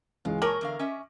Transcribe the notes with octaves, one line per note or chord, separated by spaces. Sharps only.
C#2 E3 G#3 F4
A#2 A#4 C#5 G#5 D6 A#6 F#7
E2 D3 F5
C#4 D#5 E5